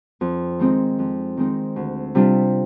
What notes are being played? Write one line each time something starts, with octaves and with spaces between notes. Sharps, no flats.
F2
D#3 G#3 C4 D#4
F2
D#3 G#3 C4 D#4
D2
C3 G3 D4 F4